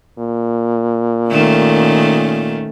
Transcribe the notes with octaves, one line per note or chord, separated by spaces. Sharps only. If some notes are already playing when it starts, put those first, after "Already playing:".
A#2
D#3 A3 C#4